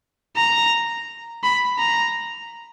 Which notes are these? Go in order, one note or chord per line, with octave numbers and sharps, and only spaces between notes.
A#5
B5
A#5